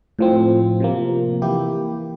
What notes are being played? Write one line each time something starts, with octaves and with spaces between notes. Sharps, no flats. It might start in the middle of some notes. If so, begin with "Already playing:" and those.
A2 F3 C4
C3 F3 A#3
E3 A#3 E4 G4